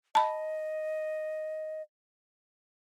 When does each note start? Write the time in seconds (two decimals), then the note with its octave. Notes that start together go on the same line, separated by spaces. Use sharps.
0.15 D#5 A5 B5